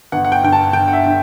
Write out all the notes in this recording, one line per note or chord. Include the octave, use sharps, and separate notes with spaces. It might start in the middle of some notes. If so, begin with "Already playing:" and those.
G1 F#5
F#5
G5
G2 D3 G5
A5
G1 G5
F#5
E5
D3